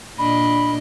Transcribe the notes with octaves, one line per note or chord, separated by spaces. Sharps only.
A#2 D4 D#5 B5